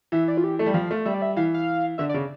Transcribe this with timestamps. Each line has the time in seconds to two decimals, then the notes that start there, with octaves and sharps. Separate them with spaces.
0.12 E3 E5
0.28 D5
0.37 F4
0.44 G4
0.59 A3 A4
0.66 G3
0.74 F3 F5
0.91 A3
1.05 G3 E5
1.14 D5
1.22 E5
1.37 E3 F5
1.54 F5
1.98 D3 E5
2.09 D5
2.14 C#3